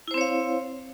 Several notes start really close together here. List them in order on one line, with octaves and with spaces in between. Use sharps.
E4 C5 C4 C#5 F5